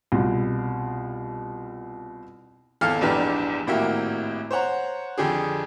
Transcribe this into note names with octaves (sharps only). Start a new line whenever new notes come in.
C2 B2 F4
G#1 E2 A4 F5 F6
A#1 E2 G#2 D4 G4 B4
G#1 A2 A#3 F#4 G4 E5
C5 C#5 F#5 A#5
F2 D3 D4 G4 G#4